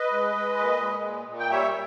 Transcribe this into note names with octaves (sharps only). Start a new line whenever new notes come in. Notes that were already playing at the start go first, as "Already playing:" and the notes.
Already playing: B4 D#5
G#3
G#3
A#2
G#3
A#2
A#2
G5
G3 C#5 E5